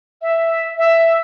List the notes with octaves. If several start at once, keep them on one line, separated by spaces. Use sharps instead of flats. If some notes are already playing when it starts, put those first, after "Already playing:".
E5
E5